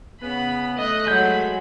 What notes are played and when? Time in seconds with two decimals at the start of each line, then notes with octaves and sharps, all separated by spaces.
0.22 C#3 B3 B5
0.78 A3 D#5 F#6
1.07 F#3 G#3 B5 G6